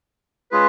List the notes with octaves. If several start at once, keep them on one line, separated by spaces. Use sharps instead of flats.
G#3 C#4 F4 G#4 B4